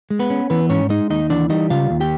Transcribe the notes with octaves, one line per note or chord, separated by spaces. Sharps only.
G#3
B3 B4
C#4
E3 B3 B4
G#2 C#4 C#5
G#3 D#4 D#5
D#2 D#4 D#5
E3 D4 D5
G3 D#4 D#5
C#3 F4 F5
D#2
G4 G5